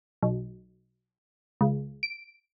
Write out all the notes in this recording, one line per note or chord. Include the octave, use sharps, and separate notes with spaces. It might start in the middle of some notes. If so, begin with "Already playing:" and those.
B1
C#2
D7